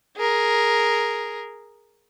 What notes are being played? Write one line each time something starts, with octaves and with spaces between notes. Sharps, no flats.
G#4 A#4